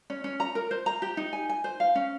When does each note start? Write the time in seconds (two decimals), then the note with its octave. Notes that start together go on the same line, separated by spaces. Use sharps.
0.10 C#4
0.24 C#4
0.40 A#5
0.55 A#4
0.71 C5
0.86 A#5
1.02 G4
1.17 D#4
1.33 G#5
1.49 G#5
1.64 C5
1.80 F5
1.95 C#4